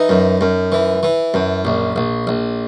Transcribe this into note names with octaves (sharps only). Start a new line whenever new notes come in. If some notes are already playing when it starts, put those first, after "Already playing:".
Already playing: E3 D#4
F#2
F#2
E3
E3
F#2
A#1
A#1
A#1